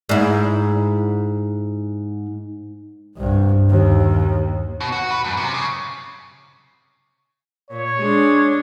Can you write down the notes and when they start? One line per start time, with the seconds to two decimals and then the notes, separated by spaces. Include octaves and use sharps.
0.09 G#2 E4
3.17 C2 G2
3.69 D#2
4.81 B2
4.92 F#4
5.10 B4
5.24 F#2
5.37 C3
5.54 C#3
7.70 A#2 C#5
8.00 G#3 D4